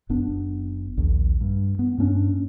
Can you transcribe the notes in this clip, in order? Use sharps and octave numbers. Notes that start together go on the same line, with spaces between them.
F#1 B3 D4
A#1 D#2
G2
B3
G2 A#3 C#4 D4